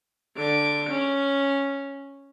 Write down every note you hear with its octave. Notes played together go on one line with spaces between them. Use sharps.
D3 D6
C#4